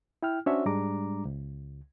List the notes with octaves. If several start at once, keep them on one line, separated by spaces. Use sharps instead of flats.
E4 G5 F6
C#4 D4 F#4 C5 C#5 E5
G#2 G3 G#3 D4 A#5 D6
C#2